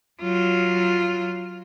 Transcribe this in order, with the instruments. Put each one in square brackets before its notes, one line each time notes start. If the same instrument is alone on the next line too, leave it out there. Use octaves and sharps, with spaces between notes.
[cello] F#3 F4